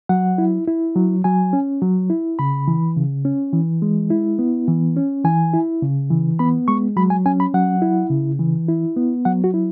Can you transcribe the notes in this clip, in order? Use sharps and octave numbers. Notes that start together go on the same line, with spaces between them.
F#3 F#5
E4
E4
F#3
F#3 G#5
C#4
F#3
E4
C#3 B5
E3
C#3
C#4
E3
G#3
E4
B3
E3
C#4
E3 G#5
E4
C#3
E3
B3 B5
G#3 C#6
F#3 B5
G#5
C#4 G#5
B5
F#3 F#5
E4
C#3
E3
E4
B3
F#3 F#5
F#4
E4